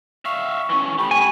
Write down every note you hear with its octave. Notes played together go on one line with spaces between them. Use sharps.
E5 F5 C#6
E3 C#4
A3 G4 B5
G#5 C#6